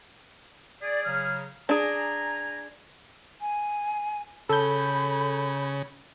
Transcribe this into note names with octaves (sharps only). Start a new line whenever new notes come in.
G#4 D5
C#3 F#3 F6
D4 G#4 G#5 A#5
G#5
C#3 A4 B5 G6